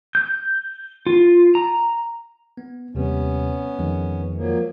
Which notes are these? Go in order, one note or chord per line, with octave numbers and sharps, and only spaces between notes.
G6
F4
A#5
B3
D#2 C3 G3 B3 C#4
F2 D#3 G#3
F3 F#3 A#3